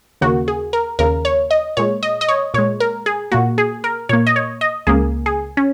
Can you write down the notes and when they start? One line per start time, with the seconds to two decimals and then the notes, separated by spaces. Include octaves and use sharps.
0.21 D#2 C#3 A#3 F#4
0.48 G#4
0.73 A#4
0.99 D#2 C#3 A#3 A#4
1.25 C#5
1.51 D#5
1.77 A#2 G#3 C#5
2.03 D#5
2.21 D#5
2.29 C#5
2.54 A#2 C#5
2.58 G#3
2.80 A#4
3.06 G#4
3.32 A#2 A#3 F#4
3.58 G#4
3.84 A#4
4.09 A#2 A#3 C#5
4.27 D#5
4.36 C#5
4.61 D#5
4.87 C#2 C#3 A#3 G#4
5.26 G#4
5.57 C#4